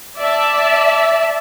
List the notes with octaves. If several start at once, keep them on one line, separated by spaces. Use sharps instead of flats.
D5 E5 A5